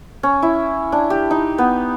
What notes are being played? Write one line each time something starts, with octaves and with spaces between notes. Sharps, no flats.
C#4
E4
D4
G4
D#4
B3